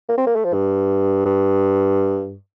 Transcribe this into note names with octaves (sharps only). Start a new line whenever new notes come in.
A#3
C4
A#3
A3
F3
G2
G2